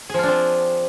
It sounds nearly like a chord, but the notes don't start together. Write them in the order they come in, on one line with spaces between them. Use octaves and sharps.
G#4 F3 F4 D4 C4